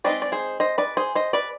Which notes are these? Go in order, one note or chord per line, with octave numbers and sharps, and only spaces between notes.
G#3 C4 D#4 B4 D5
D5
G#4 C5
C5 D#5
B4 D5
G#4 C5
C5 D#5
B4 D5